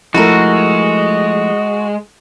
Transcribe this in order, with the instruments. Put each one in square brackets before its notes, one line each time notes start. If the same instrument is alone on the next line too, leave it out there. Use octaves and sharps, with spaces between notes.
[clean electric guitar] F3 A3 [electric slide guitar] G#3 [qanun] E4 A4 A#4 [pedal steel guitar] F#4